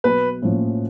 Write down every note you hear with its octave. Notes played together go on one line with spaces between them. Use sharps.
B1 B4
A2 F3 A#3 C#4